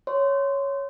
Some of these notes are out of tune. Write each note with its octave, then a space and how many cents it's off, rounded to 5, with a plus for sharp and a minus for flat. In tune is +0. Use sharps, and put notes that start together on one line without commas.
C#5 +0 C6 -15